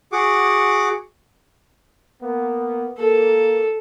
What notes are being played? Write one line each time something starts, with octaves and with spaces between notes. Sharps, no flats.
F#4 G#4 F#5 D6
A#3 B3
A#3 A4